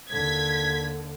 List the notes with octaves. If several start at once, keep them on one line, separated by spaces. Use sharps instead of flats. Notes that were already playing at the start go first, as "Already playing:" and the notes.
D#2 D3 G#6 B6